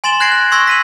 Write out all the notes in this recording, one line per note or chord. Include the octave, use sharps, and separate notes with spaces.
G#5 C6 A6 E7 F#7 G7
F#6 G#6 A#6 C7 D7
F#6
C6 C#6 E6 G#6 A#6 C7
B6 D#7 F#7